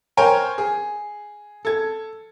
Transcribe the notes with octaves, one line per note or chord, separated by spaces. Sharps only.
A#4 C5 C#5 G5 G#5 A#5
G#4
A4 G#6